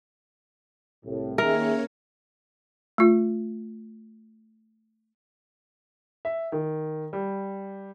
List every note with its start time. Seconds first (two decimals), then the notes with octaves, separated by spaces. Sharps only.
1.04 C2 A2
1.38 D#3 A#3 C#4 G#4 A#4 C#5 E5
2.98 A3 F4
6.25 E5
6.52 D#3
7.13 G3